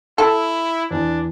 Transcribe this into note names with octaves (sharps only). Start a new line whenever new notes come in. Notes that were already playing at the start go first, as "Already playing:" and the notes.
E4 A4
E2 D4